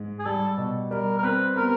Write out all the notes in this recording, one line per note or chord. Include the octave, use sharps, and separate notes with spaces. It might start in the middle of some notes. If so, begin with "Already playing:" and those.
Already playing: G#2
G#4
G3 A4
B2
G3 A#4
A#4
C4 B4
B3 A#4